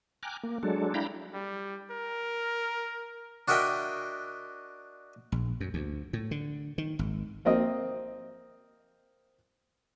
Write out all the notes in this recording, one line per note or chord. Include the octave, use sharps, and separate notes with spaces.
G5 G#5 A#5 D6 F6 F#6
A#3
F#3 G#3 D4 A4
D4 E4 F5 G5 A#5 B5
G3
A#4
D4 F#4 A#4 D#5 E5 G5
A#1
F#2
D2
A2
D3
D#3
G#1
A#3 C4 D#5 D#6